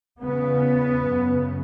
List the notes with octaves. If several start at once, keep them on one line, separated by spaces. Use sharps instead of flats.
E2 C#3 B3
F#2 C#3